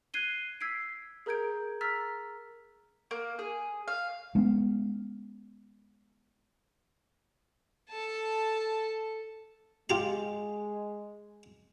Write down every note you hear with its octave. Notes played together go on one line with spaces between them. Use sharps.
F#6 G#6 C7 D#7 G7
E6 G#6 B6 C7 D7
G#4 A#4 A#5 G6 G#6 D7
A#5 E6 F6 A6 B6
A#3
G#4
F5
G#3 B3 C#4 D4
A4 A5
G#3 F4 G4 A#5